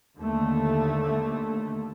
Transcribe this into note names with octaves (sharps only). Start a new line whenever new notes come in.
D#2 D3 A3